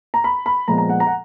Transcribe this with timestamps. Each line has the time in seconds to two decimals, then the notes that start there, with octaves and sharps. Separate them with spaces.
0.14 A#5
0.24 B5
0.46 B5
0.68 A#2 F3 G#3 B3 A#5
0.78 A#5
0.89 F#5
1.00 A#5
1.06 F#5